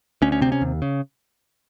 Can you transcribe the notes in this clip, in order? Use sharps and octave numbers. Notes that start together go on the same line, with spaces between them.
D2 C#4
C#4
C3 C4
C#4
D#2
C#3